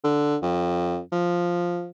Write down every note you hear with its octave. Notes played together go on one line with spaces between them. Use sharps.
D3
F2
F3